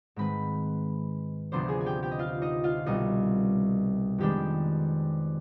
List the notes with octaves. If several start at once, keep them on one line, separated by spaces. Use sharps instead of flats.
G#2 D#3 G#3 C4 B4 B5
D2 C3 F3 B3 D4 C5 C6
G#4 G#5
G#5
G4 G5
G4 G5
D#5
F4 F5
D#4 D#5
F4 F5
C2 B2 G3 D#4 D#5
F2 D#3 G#3 B3 D4 G4 G5